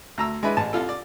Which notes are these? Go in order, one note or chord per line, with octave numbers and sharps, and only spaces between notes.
D2 A#5 E6
G#3 D4 E4 B4
A1 A5
C2 F4 A4
D5